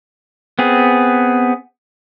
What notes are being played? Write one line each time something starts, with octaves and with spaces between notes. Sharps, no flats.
B3 C4 G#4